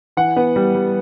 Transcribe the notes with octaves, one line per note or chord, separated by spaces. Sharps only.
E3 F#5
B3
G3
G3